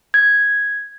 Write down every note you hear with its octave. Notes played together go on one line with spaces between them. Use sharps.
G#6